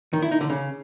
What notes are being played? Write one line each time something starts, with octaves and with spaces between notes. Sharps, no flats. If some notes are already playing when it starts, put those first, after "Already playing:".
D#3
E4
D#4
D3
C#3